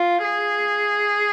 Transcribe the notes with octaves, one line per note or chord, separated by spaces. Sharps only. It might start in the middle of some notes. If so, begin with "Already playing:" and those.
Already playing: F4
G#4